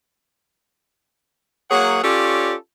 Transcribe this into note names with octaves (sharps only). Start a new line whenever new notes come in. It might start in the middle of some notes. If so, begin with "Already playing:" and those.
F#3 A#3 G#4 C#5 F#5
C#4 F4 G4 A4 C#5 D5